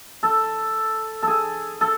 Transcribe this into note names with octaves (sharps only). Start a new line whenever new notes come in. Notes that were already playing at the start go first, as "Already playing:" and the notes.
A4
G#4 A4
A4